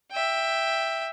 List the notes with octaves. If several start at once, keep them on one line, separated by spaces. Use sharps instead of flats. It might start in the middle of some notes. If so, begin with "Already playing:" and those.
E5 G5